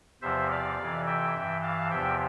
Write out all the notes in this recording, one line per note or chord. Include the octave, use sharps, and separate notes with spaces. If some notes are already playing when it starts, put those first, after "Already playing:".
E2 C3 F3 C5 E5
D5 F5
F2 C3 E3
E5 G5
G2 E3
F5 A5
E2 C3 F3 E5 G5